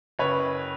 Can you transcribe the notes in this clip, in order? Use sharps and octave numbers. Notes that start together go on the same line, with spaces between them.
F#1 B4 C#5